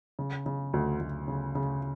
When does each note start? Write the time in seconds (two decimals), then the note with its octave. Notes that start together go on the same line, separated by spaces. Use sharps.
0.19 C#3
0.46 C#3
0.73 D2
1.01 D2
1.28 C#3
1.55 C#3